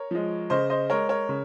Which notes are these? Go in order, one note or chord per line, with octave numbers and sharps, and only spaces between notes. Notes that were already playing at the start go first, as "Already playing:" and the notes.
Already playing: A#4 C#5
F3 G#3
C#3 C5 D#5
C5 D#5
G#3 A#4 C#5
A#4 C#5
C#3